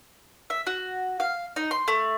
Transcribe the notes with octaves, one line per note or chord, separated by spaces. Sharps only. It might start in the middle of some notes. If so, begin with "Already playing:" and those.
E5
F#4
F5
D#4
C6
A3